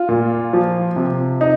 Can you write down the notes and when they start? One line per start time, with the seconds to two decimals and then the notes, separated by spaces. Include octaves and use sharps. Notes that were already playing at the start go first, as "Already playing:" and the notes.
Already playing: F4
0.09 A#2
0.53 F3
0.96 C3
1.41 D#4